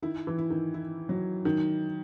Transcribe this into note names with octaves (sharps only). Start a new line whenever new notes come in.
D#3 E4
E3
E4
D#3
E4
F#3
D#3